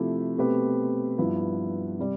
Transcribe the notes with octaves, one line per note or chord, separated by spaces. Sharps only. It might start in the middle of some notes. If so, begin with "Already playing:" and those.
Already playing: C3 F3 A3 E4 G4
B2 A3 C4 G4 B4
G2 F3 B3 E4
C3 G3